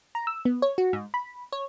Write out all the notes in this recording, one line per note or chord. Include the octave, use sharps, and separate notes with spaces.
A#5
E6
B3
C#5
F#4
G#2
B5
C#5